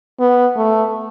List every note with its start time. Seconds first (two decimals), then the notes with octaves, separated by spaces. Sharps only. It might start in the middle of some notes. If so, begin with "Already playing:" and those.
0.20 B3
0.57 A3